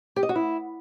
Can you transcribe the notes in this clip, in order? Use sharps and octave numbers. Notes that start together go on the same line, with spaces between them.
G4
D#5
F#4
E4